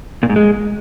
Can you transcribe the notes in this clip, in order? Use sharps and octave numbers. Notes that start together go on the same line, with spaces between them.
A#2
G#2
G#3